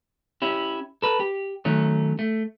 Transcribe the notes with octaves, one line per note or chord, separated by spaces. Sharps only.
C#4 E4 G4
A4 B4
G4
D#3 F#3 A3 C#4
A3